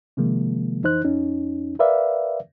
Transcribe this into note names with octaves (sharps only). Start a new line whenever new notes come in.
C3 D#3 F3 G#3 A#3
F2 E3 D#4 C5 F#6
F2 C#4 D#4
A#4 B4 D5 E5 F5